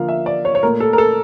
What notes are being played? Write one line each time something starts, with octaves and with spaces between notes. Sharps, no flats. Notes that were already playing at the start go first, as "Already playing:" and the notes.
Already playing: D3 F3 A#3 F5
E5
D5
C#5
C#5
A#2 A3 A#4
A4
A#4
A4